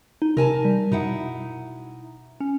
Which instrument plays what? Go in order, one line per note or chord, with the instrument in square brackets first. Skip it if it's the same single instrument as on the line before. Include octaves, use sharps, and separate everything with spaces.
[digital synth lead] D#4
[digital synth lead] C3 [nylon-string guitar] A#4 G#5 A5
[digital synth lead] G3
[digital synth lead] B2 [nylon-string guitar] D#4 E4 F#5
[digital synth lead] C#4